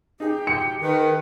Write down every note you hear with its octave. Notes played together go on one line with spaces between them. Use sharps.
D#4 G4 G#4
C#7
D#3 B4